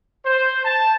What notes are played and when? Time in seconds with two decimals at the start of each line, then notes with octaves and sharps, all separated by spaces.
0.25 C5
0.64 A5